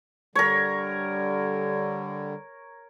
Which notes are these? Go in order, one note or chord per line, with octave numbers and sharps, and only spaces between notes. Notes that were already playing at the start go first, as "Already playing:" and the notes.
D3 G3 A#4 C#5